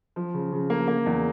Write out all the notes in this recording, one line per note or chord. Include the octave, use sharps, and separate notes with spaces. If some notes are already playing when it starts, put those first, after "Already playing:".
F3
C#3
C#3
A#3
A#3
E2